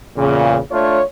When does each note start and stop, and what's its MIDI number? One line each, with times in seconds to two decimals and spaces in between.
0.16 0.59 40
0.16 0.59 46
0.16 0.59 49
0.71 1.01 57
0.71 1.01 62
0.71 1.01 65
0.71 1.01 73